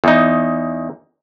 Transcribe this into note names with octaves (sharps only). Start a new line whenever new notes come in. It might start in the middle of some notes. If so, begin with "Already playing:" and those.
E2 D#4